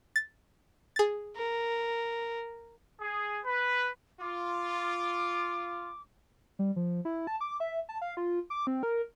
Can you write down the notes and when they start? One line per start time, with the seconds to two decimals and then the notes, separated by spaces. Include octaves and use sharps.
0.16 A6
0.96 G#4 A6
1.36 A#4
3.01 G#4
3.46 B4
4.20 F4 D6
6.59 G3
6.76 F3
7.05 E4
7.27 A5
7.41 D6
7.60 E5
7.89 A5
8.02 F5
8.17 F4
8.50 D6
8.67 C4
8.83 A#4